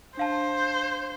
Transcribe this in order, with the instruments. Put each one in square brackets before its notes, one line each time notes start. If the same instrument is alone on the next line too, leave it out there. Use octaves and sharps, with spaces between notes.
[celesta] D4 F5 A5 [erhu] C5